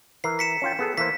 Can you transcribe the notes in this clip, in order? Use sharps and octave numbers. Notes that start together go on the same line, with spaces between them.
E3 A#4 C7
B6 C#7 E7
C#4 F4 G5
B3 G#4 A4
E3 A#3 C5 B6